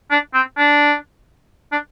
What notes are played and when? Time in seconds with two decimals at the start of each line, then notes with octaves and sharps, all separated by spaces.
0.11 D4
0.34 C4
0.57 D4
1.72 D4